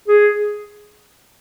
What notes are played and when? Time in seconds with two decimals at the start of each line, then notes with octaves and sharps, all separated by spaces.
0.08 G#4